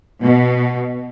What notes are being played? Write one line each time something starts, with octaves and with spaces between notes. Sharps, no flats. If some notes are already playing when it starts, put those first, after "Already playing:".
B2